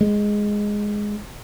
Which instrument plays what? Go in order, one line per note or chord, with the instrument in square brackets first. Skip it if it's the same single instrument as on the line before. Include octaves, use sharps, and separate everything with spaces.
[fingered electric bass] G#3